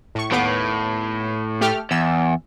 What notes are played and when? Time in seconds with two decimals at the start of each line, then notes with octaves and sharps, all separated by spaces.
0.15 A2 C#6
0.32 D#2 A2 B3 D6
1.61 A3 G4 F6
1.91 E2 E6